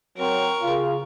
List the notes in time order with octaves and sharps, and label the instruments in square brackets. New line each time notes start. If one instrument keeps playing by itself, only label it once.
[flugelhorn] F#3 [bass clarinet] C4 [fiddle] A#4 C#6
[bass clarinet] C#3 [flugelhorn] F4